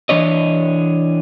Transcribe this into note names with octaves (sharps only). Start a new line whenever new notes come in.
E3 D4 C#5 D#5